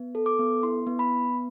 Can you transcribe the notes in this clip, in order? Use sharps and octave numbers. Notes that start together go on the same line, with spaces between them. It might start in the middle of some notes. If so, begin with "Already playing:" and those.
Already playing: B3
A4
D6
B3
E4 C6
B3
B5